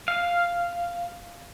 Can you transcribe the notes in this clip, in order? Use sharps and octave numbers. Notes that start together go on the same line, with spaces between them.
F5